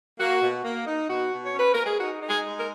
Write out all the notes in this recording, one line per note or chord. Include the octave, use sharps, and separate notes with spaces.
A#3 F#4
B2
A#3
D#4
B2 F#4
B2
C#5
C#4
B4
C#4 A#4
G#4
D#4 F#4
D#4
G#4
G#3
A#4